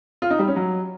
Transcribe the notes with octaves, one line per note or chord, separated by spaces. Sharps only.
F4
D#4
G3
C#4
F#3